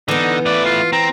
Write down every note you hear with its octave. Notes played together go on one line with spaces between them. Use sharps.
D3 E3 B3 D#4
A3 B4 D5
F4
C4 A#5